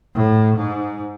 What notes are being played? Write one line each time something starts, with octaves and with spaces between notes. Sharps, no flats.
A2
G#2